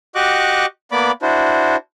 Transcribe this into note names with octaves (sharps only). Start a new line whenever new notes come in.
F#4 G4 D#5 C#6 D6 F#6
A#3 B3 D5 B5 D6
D4 E4 F#4 C5